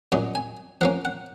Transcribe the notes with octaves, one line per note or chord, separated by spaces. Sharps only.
A#2 F#3 C#4 D#5
G#5
F3 A#3 C#4 F#5
F#5